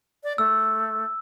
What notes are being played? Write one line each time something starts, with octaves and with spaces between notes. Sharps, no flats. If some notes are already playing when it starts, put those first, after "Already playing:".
D5
A3 E6